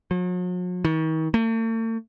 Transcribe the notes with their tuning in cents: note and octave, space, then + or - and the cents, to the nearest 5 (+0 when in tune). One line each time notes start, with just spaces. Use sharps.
F#3 -45
D#3 +40
A3 +45